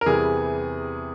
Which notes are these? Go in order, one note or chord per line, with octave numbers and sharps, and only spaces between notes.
A#4
E2 C3 E3 G3 G#4